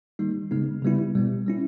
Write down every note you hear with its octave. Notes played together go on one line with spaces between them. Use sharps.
D#3 G3 A#3 D#4
C#3 G#3 B3 D#4
C#3 G3 B3 E4
B2 G3 B3
G3 C#4 E4